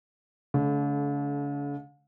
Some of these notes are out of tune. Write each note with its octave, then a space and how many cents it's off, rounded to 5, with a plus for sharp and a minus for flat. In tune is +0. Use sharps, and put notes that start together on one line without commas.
D3 -45 A3 -30